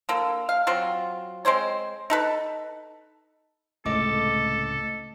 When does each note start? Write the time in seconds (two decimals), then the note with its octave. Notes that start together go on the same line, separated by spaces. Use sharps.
0.09 D3 A#3 A4
0.49 F5
0.67 F#3 C4 F4 F#4
1.45 G#3 C4 C5 C#5
2.10 D#4 A4 B4
3.86 C#2 A2 C3 A3 A4 D#5 D6